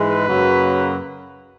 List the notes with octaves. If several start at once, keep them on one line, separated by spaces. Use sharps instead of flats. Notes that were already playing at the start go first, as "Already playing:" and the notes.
Already playing: G#2 E3 G#3 B4
F#2 C#3 F#3 A#3